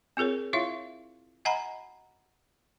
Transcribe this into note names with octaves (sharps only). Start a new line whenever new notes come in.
C4 F4 G#4 A#4 C#5
E4 F4 C#5 E5 F5
D#5 F#5 G#5 A#5 B5